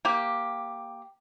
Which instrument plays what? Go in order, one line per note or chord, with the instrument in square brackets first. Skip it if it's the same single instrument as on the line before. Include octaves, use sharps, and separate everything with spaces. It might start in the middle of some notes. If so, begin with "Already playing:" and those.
[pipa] A#3 G4